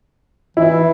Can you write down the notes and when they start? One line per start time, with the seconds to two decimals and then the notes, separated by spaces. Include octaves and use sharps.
0.57 E3 E4